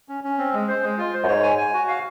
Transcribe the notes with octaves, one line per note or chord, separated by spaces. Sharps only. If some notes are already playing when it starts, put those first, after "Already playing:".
C#4
C#4
C4
G#3
C5
G#3
F4
C5
F#2
G#2 C#5
G#5
G#5
F#4
F5